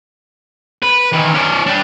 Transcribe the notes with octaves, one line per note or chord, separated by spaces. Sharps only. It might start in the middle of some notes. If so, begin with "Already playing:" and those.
B4
D#3 E3
C#4 D5
D4 G4